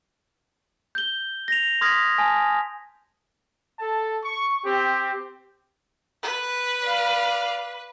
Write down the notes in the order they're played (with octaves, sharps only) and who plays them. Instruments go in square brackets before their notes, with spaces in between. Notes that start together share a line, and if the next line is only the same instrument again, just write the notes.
[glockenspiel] G6 G7
A#6 F7
C6 D#6 F6 G#6 A#6 B6
G#5 A5
[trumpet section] A4 A5
C#6
C4 G4
[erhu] B4
[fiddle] D5 F5